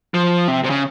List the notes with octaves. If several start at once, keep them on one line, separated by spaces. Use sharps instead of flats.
F3
C3
C3
C#3